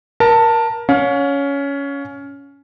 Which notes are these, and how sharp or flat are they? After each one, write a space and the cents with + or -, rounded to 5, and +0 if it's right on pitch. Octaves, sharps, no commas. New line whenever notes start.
A#4 +20 A5 +20
C#4 +15 F5 +40